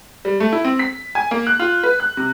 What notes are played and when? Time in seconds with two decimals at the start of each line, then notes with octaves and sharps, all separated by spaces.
0.25 G3
0.40 A3
0.52 E4
0.65 C4
0.79 B6
1.15 G#5
1.31 A#3
1.47 F#6
1.60 F4
1.84 B4
2.00 F#6
2.17 C3